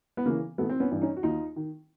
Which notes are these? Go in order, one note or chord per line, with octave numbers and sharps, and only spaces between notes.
B3
C#3 E3 A#3
G#1 A3 B3
C4
B3 C#4
G2 E3
C#4 D#4
F#4
D#2 D#4 F4
D#3